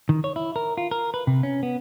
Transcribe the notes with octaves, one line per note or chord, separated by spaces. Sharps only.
D#3
C#5
E4
A#4
F4
A#4
B4
C3
C#4
B3